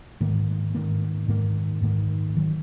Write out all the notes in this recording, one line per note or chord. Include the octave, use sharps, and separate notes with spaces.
G#2 D#3 A#3
G#2 D#3 A#3
G#2 D#3 A#3
G#2 D#3 A#3
D#3 F#3